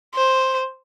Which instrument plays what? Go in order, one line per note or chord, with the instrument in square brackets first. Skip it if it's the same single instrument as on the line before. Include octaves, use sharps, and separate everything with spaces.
[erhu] C5